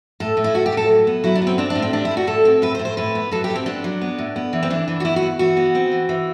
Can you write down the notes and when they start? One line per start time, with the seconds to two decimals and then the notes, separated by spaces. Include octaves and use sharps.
0.20 A2 A4
0.37 A2
0.44 E4
0.54 A2 F#4
0.66 G4
0.72 A2 A4
0.89 F#3
1.07 B3
1.24 F#3 E4
1.35 D4
1.42 B3
1.47 C4
1.58 C4 D4
1.70 D4
1.75 A2
1.82 C4
1.93 G3 D4
2.05 E4
2.11 A2
2.17 F#4
2.27 A2 A4
2.45 C4
2.62 A2 B4
2.75 C5
2.79 A2
2.85 C5
2.97 A2 B4
3.15 B3
3.31 F#3 A4
3.44 G4
3.50 A2
3.56 C4
3.66 B3 D4
3.84 F#3
4.02 B3
4.18 A2
4.36 B3
4.53 E3
4.63 C4
4.70 E3 D4
4.88 E3
5.00 F#4
5.05 B3 E4
5.16 F#4
5.22 B3
5.39 E3 F#4
5.57 B3
5.75 C4
5.92 E3
6.09 E3